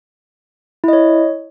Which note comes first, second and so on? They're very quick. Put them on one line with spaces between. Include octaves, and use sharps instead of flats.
E4 D#5 C#5